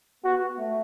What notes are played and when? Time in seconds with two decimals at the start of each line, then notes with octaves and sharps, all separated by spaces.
0.24 B3 F#4
0.58 A3